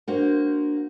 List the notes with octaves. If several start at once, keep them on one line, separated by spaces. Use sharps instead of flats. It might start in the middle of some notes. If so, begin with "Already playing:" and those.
A#3 D4 F#4 C5